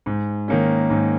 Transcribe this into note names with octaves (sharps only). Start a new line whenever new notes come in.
G#2
D#3 A#3 C#4
G#2